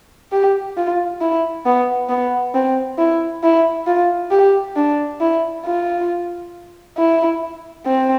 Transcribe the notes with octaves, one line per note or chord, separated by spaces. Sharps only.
G4
F4
E4
B3
B3
C4
E4
E4
F4
G4
D4
E4
F4
E4
C4